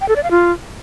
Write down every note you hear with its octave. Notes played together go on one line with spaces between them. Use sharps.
G5
A4
D5
F5
F4